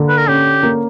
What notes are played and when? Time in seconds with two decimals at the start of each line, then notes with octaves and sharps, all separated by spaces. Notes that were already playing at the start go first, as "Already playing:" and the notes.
Already playing: D3 A#3
0.08 B4
0.18 A#4
0.28 C#4 G4
0.63 A#3